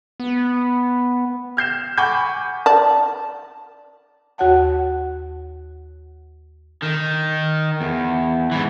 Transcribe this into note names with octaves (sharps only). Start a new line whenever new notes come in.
B3
F6 G6 C7 E7
F#5 G#5 B5 C#6 D6 G6
D5 A5
D#2 F#4 C#5 F#5 A5
D#3
E2
G#2 E3